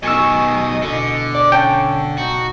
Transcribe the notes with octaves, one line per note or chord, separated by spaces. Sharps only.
B2 D#3 D#5 G#5 C#6 E6
B2 D3
D5
C#4 G5 A5
D#4 F#4